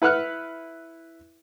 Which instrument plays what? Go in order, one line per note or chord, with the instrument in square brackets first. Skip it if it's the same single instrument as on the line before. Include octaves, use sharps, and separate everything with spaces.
[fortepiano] E4 B4 F#5 F6 F#6